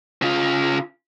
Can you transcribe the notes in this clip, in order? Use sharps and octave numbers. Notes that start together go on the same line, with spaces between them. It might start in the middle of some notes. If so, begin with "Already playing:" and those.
C#3 F4